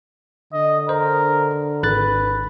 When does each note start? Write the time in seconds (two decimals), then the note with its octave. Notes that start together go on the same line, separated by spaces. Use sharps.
0.53 D3 D#5
0.89 A#4 C5
1.83 G#1 B4 F#6 A6